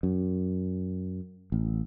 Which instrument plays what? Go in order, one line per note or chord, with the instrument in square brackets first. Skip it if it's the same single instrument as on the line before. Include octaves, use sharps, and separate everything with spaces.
[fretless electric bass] F#2
A1